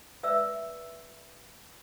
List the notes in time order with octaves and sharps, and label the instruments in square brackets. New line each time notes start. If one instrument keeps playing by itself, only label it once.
[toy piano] B4 D5 E5 E6